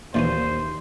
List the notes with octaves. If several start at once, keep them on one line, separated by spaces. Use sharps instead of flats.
D#2 A#2 E3 C#4 C5